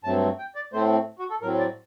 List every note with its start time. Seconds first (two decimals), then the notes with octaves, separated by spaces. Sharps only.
0.04 G2 F#3 A3 C4 A5
0.39 G5
0.55 D5
0.73 A2 A3 C4 C5
1.19 F#4
1.30 A4
1.42 A2 F#3 C4 A#4
1.59 D5